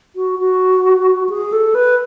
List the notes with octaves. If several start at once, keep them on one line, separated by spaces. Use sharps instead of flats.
F#4
F#4
G#4
A4
B4